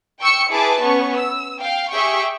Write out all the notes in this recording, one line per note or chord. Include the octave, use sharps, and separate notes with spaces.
G5 C#6 E6 C#7
E4 G#4 B4 A5 D6
B3 C#4 C#6
E6
F5 G5
G4 G#4 E5 G5 C#6